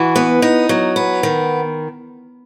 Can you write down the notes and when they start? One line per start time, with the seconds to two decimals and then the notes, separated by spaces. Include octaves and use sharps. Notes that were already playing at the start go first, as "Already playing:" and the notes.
Already playing: E3 F#4
0.16 B3
0.42 D#4
0.69 F#3
0.96 B3
1.23 D#3